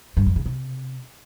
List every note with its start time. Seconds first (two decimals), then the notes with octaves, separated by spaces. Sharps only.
0.17 G2
0.26 F2
0.36 C#3
0.46 C3